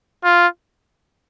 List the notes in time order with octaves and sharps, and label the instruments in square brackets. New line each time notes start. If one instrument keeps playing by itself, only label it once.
[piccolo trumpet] F4